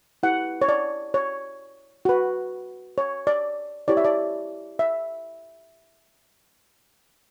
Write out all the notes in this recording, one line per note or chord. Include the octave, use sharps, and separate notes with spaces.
E4 G4 B4 F#5
C#5
D5
C#5
F#4 B4
C#5
D5
E4 G4 C#5 D5
E5
D5
E5